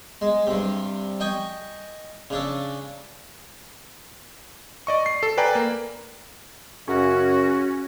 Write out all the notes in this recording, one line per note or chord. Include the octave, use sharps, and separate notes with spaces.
G#3
G2 C3
D#5 G5 G#5 C#6
C#3 D4 A4
D5 D#5 C#6
C7
A4
B4 D5 G5 G#5 A#5
A#3
F#2 C#3 C#4 F#4